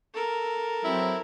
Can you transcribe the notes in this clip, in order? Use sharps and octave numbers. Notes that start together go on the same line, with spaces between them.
A4 A#4
F#3 C4 E4